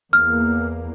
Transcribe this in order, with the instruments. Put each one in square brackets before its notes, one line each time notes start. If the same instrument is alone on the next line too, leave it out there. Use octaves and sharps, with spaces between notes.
[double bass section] E2 A#3 [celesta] F6